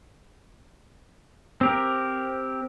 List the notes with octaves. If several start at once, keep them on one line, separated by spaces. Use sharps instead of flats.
C4 G4 A#4